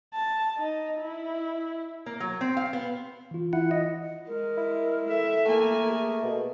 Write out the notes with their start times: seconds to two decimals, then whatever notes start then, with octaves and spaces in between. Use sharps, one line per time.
0.14 A5
0.57 D#4
1.00 E4
2.06 A#3
2.20 F#3
2.41 C4
2.57 F5
2.73 B3
3.31 E3 F4
3.53 E4 F#5
3.71 D#5
4.28 G#3 A#4
4.57 E4
5.08 A4 E5
5.46 A3 A#3 G#5
5.88 G#4
6.23 B2